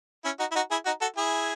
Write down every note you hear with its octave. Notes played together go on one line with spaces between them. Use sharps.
C#4 E4
D#4 F#4
E4
D#4 F#4
E4 G#4
D#4 F#4
F#4 A4
E4 G#4